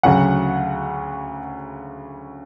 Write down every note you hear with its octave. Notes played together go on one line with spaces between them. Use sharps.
D2 C#3 F#3 F#5